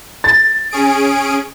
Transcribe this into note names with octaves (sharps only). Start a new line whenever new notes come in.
A6
C#4 G#4 D7